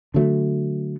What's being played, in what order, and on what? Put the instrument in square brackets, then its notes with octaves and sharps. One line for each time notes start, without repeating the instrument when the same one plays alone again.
[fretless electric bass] D3 F#3 A3